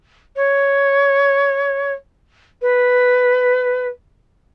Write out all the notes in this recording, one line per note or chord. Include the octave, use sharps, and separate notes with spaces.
C#5
B4